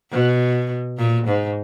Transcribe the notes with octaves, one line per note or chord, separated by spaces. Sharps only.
B2
A#2
G#2